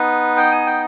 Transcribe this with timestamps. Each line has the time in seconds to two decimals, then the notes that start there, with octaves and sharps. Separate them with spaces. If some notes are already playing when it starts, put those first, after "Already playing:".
Already playing: B3 D#4 B4
0.37 G5
0.52 G#5
0.67 G5